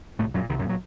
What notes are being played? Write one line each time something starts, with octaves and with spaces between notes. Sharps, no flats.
C2 A2 A3
F#2 A#2 F#3
C2 D#3
F#2 F#3
A#2
F#3